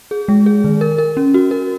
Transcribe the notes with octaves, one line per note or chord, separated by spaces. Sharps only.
G#4
G#3
G#4
D#3
A#4
A#4
C#4
F#4
A#4